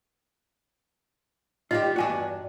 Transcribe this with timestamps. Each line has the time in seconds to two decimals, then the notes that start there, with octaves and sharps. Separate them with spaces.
1.71 D#3 G3 F4 G4 D#5
1.96 E2 G2 D4 F#4 G#5